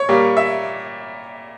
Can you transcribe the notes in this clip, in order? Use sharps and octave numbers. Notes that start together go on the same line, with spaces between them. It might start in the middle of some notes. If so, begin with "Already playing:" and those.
Already playing: C#5
A#2 G3 A#3
E5